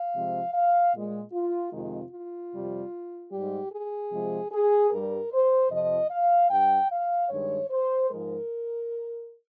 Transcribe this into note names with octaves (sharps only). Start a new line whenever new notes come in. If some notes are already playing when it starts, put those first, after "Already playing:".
Already playing: F5
C3 F3 G#3
F5
A#2 G#3
F4
F2 C3 D#3 G#3 F4
F4
F2 C3 G3
G#2 G3 G4
G#4
C3 F3 G#3
G#4
G2 G3 A#4
C5
F2 C3 F3 D#5
F5
G2 G3 G5
F5
G2 D#3 G#3 C#5
C5
G#2 F3 G#3 A#4